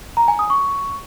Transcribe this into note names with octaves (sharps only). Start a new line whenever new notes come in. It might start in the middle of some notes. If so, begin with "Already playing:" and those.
A#5
G#5
D#6
C#6